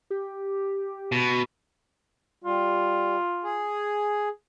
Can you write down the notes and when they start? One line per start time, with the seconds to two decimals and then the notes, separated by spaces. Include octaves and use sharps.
0.10 G4
1.12 B2
2.44 G3 F4
3.44 G#4